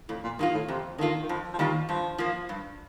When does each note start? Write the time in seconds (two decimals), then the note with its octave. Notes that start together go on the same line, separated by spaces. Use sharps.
0.09 F2 A2
0.24 A#2
0.38 G2 D#3 A#3 F4
0.54 A2
0.68 F2 C3
0.98 D3 D#3 A#3 F4
1.22 D#3
1.29 F2 F3
1.53 F3
1.58 D#3 G3 A#3 F4
1.89 G2 F3
2.18 F3 A#3
2.49 G2